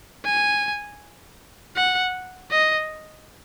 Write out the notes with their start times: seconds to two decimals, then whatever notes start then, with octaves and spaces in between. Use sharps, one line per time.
0.25 G#5
1.76 F#5
2.51 D#5